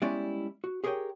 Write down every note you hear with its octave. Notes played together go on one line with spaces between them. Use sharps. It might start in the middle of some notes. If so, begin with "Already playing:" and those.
G3 G#3 B3 C#4 E4 D5
F#4
G4 G#4 A#4 B4 C#5 G5